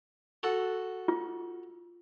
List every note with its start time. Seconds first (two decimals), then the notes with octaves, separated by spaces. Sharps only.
0.43 F#4 A4
1.08 F4